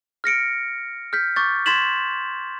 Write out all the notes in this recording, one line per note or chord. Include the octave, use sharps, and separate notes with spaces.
F6 A#6 C#7 D7
F6 G6 B6
C#6 D6 G6 A6
C6 G#6 A6 B6 E7 F#7